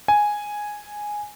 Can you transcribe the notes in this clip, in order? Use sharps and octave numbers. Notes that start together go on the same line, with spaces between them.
G#5